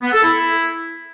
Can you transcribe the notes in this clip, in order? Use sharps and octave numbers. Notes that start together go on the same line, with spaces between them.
B3
A4
E4